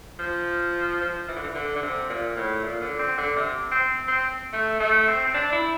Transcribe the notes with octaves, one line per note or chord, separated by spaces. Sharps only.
F3
F3
E3
D3
E3
D3
D3
C3
A#2
A2
A#2
D3
C4
D3
C3
C4
C4
A3
A3
C4
C4
D4
E4